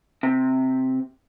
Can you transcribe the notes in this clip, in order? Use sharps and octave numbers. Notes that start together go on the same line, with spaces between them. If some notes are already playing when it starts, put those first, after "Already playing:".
C3